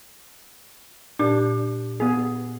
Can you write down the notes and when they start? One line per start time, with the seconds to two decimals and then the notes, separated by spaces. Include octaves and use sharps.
1.19 A#2 D4 G4
2.00 B3 G#4